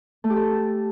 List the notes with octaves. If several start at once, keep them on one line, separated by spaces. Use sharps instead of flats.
A3
G4
A4